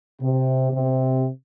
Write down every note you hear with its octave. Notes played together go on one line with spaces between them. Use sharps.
C3
C3